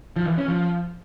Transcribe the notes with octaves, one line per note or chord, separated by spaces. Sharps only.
F3
E3
C#4
F3